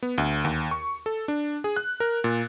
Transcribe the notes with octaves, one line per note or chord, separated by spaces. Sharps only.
B3
D2
D#2
C#6
A4
D4
G#4
F#6
A#4
A#2